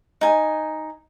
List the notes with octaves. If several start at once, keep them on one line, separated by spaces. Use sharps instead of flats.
D#4 G#5